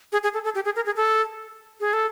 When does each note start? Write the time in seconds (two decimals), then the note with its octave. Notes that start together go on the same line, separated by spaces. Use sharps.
0.12 G#4
0.23 G#4
0.34 A4
0.44 A4
0.55 G4
0.65 G#4
0.76 A#4
0.86 G#4
0.96 A4
1.80 G#4
1.93 A4